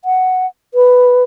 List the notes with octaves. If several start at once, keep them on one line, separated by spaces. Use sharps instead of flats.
F#5
B4